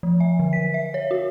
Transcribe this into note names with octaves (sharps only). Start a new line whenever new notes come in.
F3
E5
D3
B6
E5
C#5
F#4